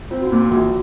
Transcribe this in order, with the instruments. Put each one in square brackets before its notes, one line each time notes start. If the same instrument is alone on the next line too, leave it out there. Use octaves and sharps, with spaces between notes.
[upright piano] C4 [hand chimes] F4
[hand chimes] F#4
[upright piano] A#2 [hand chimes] F4
[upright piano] A#1 [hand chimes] F#4